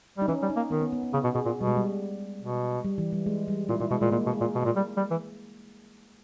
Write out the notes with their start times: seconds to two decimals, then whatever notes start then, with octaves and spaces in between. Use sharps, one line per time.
0.18 G3 D#4
0.28 E3 C#4
0.42 G3
0.50 D#4
0.56 A#3
0.71 D#3 B3
0.81 B3
0.92 B3
1.03 B3
1.13 C#3 B3
1.24 B2
1.35 B2 G#4
1.45 A#2
1.56 B2 G3
1.67 G#3
1.77 G3
2.41 B2
2.84 G3
2.98 E3
3.13 G3
3.26 G#3
3.48 G3
3.69 A#2 E4
3.80 A#2 E4
3.91 B2 G#3
4.01 A#2 G#3
4.11 A#2 A#3
4.26 B2
4.33 G#4
4.41 A#2
4.55 B2
4.65 A#2
4.76 G3
4.97 G3
5.11 E3